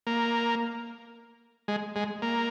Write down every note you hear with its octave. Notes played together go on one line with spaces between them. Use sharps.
A#3
G#3
G#3
A#3